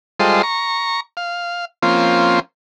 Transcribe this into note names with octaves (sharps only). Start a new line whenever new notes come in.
G3 G#3 F4 A4 C5 D#5
A#5 C#6
F5
F3 A#3 C4 C#4 F4